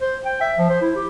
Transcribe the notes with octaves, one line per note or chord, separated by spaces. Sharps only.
C5
G5
E5
F3
C5
E4
G4